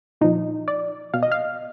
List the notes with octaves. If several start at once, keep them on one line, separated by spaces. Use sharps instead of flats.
A#2 F3 D#4
D5
B2 F5
D#5
F5